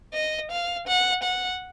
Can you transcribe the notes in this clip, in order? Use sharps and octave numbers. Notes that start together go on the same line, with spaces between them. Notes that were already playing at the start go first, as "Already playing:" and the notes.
D#5
F5
F#5
F#5